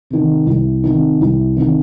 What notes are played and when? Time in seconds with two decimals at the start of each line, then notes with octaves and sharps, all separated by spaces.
0.10 C3 D#3
0.46 C2
0.84 C3 D#3
1.21 C2
1.57 C3 D#3